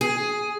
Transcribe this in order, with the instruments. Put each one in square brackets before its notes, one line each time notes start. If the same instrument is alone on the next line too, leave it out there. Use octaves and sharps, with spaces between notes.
[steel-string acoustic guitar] G#4